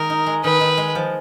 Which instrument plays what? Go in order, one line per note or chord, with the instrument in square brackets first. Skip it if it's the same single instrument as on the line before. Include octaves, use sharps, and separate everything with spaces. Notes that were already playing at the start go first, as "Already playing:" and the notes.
Already playing: [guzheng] D#3 G#3 [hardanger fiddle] A#4
[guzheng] D#4
G#3
[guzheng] D#3 [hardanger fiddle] B4
[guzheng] D#3
G#3
F3